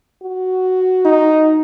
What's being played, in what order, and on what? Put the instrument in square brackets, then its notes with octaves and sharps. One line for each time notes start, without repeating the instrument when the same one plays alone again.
[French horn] F#4
[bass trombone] D#4